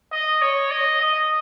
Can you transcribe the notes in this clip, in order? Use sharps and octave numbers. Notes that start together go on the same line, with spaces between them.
D#5
C#5
D#5
D#5